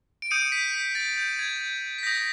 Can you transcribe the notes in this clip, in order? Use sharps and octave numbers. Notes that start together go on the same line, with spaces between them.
D7
D#6 G6 C#7 D#7
B6
B6
A6
G6
G#6
B6
D#6 G6 A#6